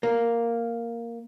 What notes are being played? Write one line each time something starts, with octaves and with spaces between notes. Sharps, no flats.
A#3